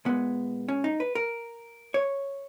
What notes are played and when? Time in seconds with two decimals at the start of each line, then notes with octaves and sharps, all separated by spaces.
0.05 A#2 G#3 B3
0.68 C#4
0.84 D#4
1.00 B4
1.15 A#4
1.94 C#5